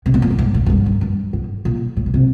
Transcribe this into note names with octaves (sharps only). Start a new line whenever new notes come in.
C3
B2
A#2
A2
G#2
A2
G#2
G2
F#2
G2
G#2
A#2
A2
B2
C3